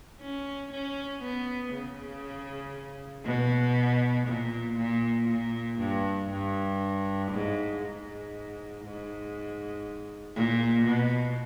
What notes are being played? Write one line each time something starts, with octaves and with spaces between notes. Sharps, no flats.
C#4
C#4
B3
C#3
B2
A#2
A#2
A#2
G2
G2
G#2
G#2
G#2
A#2
B2